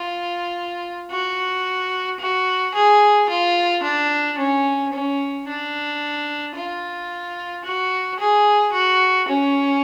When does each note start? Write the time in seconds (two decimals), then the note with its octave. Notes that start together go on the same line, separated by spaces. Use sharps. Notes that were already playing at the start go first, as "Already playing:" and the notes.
Already playing: F4
1.11 F#4
2.19 F#4
2.74 G#4
3.29 F4
3.83 D4
4.37 C#4
4.93 C#4
5.47 D4
6.56 F4
7.64 F#4
8.19 G#4
8.72 F#4
9.28 C#4